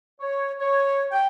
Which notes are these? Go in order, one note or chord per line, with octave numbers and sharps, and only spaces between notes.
C#5
C#5
G5